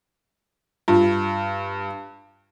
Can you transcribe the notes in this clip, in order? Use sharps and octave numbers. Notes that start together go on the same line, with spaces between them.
G2 F4